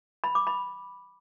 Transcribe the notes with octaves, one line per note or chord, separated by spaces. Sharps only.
B5
D6
B5